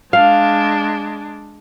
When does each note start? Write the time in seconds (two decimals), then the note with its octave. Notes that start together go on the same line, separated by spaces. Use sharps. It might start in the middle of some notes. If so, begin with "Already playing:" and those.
0.13 G#3 D4 F5